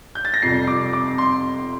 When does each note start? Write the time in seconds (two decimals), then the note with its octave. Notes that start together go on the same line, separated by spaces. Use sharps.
0.15 G6
0.25 A6
0.34 A#6
0.42 F2 C3 G3 C7
0.67 D6
0.93 D6
1.18 C6